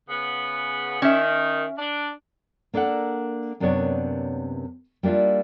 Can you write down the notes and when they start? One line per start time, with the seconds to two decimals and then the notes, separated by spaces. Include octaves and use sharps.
0.09 C#3 B3
1.02 D#3 C#4 E5
1.78 D4
2.74 A#3 D4 A4 A#4 F#5
3.60 F#2 C3 A#3 B3 D4 C#5
5.03 G3 A#3 D4 E4 F4